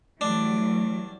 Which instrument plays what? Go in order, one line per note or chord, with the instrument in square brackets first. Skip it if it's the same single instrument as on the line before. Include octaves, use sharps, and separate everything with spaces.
[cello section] E3 F#3 G3 [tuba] A3 [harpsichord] D4